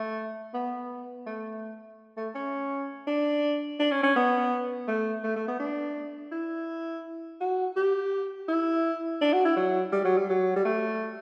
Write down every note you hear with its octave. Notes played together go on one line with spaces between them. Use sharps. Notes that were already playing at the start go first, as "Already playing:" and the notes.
Already playing: A3
B3
A3
A3
C#4
D4
D4
C#4
C#4
B3
A3
A3
A3
B3
D4
E4
F#4
G4
E4
D4
F#4
E4
F#3
G3
F#3
G3
F#3
G3
A3